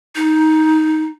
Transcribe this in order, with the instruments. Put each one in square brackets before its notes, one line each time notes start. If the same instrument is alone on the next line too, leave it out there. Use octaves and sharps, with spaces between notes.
[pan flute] D#4